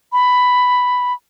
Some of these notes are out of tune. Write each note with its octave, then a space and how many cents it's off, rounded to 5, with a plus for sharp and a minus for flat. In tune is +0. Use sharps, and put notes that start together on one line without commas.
B5 +5